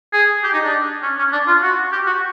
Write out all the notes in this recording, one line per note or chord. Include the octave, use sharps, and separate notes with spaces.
G#4
G4
D#4
D4
C#4
C#4
D4
F4
F#4
G4
F#4